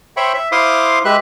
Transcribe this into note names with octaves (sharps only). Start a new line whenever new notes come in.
C5 C#5 E5 G5 B5 C#6
E5
E4 C5 F5 C6 D6 D#6
G#3 G4 B4 E5 F#6